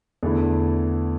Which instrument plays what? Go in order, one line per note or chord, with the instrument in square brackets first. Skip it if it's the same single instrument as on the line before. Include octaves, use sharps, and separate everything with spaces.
[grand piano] E2 D3 A3 E4